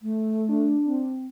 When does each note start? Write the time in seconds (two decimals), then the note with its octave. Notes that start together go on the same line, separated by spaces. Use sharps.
0.01 A3
0.49 D4
0.85 C4